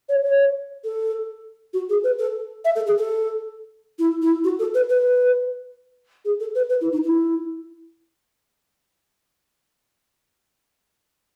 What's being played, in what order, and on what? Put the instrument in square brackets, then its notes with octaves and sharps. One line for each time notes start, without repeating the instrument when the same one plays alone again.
[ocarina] C#5
C#5
A4
F#4
G#4
B4
A4
E5
A4
G#4
A4
E4
E4
F#4
A4
B4
B4
G#4
A4
B4
B4
E4
D#4
E4